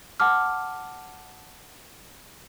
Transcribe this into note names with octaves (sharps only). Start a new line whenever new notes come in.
F#5 A5 D6 F6